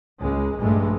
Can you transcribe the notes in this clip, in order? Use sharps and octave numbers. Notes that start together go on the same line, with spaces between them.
C#2 G#3
A#1 G2 G#3 A3